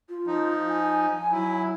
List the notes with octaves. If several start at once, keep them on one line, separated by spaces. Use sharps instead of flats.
F4
F3 D#4
G#5
F#3 E4